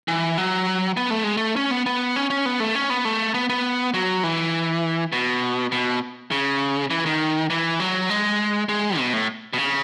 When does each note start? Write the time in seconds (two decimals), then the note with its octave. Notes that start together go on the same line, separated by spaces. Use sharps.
0.08 E3
0.38 F#3
0.97 B3
1.10 A3
1.24 G#3
1.37 A3
1.56 C#4
1.71 B3
1.86 B3
2.16 C#4
2.30 C#4
2.46 B3
2.60 A3
2.75 C#4
2.90 B3
3.05 A3
3.34 B3
3.49 B3
3.94 F#3
4.23 E3
5.13 B2
5.72 B2
6.31 C#3
6.90 E3
7.06 D#3
7.50 E3
7.80 F#3
8.09 G#3
8.69 G#3
8.98 B2
9.13 A2
9.53 B2
9.58 C#3